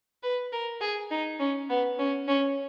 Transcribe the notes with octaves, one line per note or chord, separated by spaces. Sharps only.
B4
A#4
G#4
D#4
C#4
B3
C#4
C#4